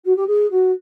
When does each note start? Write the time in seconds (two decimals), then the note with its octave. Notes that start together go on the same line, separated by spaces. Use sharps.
0.05 F#4
0.16 G4
0.27 G#4
0.50 F#4